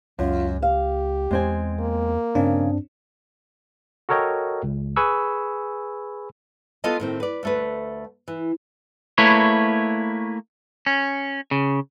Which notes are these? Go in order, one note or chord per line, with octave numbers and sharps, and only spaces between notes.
C#2 F#2 F4
G4 F5
E2 G#3 C4 G#5
A#3
G2 C#3 C4 D4
F#4 A4 A#4 C#5 D#5 G5
C#2
G#4 B4 G#5 B5 C#6 E6
B3 F4 A4 B4 D#5 A5
A2 D#3 C4
B4 D5
D2 A3 B4
E3
A3 A#3 E4 B4 C#5
C#4
C#3